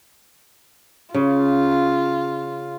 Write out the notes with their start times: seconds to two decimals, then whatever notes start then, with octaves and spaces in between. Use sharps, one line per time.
1.14 C#3 F4